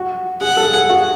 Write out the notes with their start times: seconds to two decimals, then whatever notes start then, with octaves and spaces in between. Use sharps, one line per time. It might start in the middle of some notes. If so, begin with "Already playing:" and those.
Already playing: F#4
0.41 G#4 F#5
0.57 A4
0.73 G#4
0.90 F#4